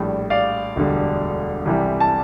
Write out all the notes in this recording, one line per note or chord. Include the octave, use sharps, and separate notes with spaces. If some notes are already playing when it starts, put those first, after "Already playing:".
Already playing: A#1 A2 G3
D5 F5
E1 D2 D3 G3
C2 C3 E3 G3
A5